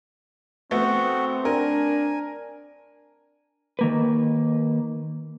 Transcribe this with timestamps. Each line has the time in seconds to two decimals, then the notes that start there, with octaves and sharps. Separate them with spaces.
0.71 A3 B3 C4 F#4
1.45 D4 A#4 G#5
3.79 D#3 A#3 B4